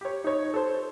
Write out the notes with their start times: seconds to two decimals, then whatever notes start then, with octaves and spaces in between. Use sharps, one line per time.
0.01 G4 C#5
0.24 D#4 C#5
0.54 A4 C5